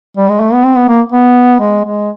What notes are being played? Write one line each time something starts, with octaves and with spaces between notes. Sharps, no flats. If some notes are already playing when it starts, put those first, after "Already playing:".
G3
G#3
A3
B3
C4
B3
A#3
B3
G#3
G#3